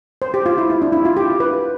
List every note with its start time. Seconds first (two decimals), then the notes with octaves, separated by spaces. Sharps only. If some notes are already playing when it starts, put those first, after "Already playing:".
0.22 C5
0.34 G4
0.46 F4
0.58 E4
0.70 E4
0.82 D4
0.92 E4
1.05 F4
1.17 G4
1.40 B4